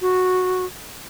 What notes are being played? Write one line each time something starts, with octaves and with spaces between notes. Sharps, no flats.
F#4